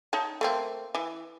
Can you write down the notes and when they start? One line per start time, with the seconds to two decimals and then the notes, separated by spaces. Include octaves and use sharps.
0.13 D#4 C#5 A5
0.41 A3 A#3 C4
0.95 E3